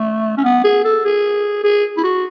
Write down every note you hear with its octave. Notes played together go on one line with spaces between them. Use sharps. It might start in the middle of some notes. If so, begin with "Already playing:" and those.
Already playing: A3
C#4
B3
G#4
A4
G#4
G#4
E4
F#4